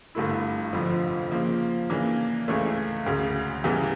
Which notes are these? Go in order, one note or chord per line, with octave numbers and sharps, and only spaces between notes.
G1 G2 D3 A3 E4
F1 F2 D3 F3
C#3 F3 A#3
C#3 E3 A#3 D4
C#2 C#3 E3 A3 C#4
E1 D2 C#3
E2 C#3 E3 G3